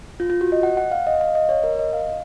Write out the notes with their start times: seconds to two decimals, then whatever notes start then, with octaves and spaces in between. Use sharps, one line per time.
0.20 F4
0.30 F4
0.41 F#4
0.52 D#5
0.63 F#5
0.77 F#5
0.91 F5
1.07 D#5
1.21 F5
1.35 D#5
1.49 C#5
1.64 A#4
1.79 D#5
1.93 F5